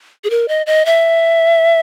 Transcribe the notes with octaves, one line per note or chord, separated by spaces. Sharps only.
G#4
A#4
D#5
D#5
E5